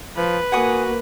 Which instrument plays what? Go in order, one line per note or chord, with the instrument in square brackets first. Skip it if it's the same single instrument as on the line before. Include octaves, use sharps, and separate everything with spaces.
[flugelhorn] F3 [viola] B4
[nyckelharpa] A#3 [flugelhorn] F#4 [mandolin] F#5 G#5 D#6